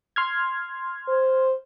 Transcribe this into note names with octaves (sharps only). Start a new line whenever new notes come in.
C6 F6 G#6
C5